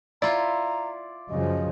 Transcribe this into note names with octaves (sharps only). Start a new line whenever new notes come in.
E4 F4 D5 A#5
F#2 C#3 F3 D#5